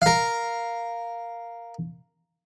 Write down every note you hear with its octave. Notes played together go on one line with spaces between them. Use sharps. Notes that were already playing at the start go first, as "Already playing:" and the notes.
A#4 F5